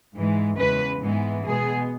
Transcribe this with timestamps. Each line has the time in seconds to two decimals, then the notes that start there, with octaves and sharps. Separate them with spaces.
0.15 G#2 E3 G#3
0.58 E2 C#3 G#3 B4
1.02 G#2 E3 G#3 B3
1.45 B2 G#3 B3 G#4